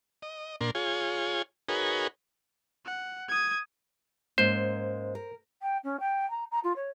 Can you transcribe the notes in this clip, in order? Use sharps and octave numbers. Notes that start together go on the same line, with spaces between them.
D#5
A#2 D4 A#4 C6
F4 G#4 C#5
D#4 F#4 G#4 A#4 B4 C#5
F#5
D#6 G#6
G#2 A#3 C#4 C5
A#4
G5
C#4
G5
A#5
A#5
F4
C#5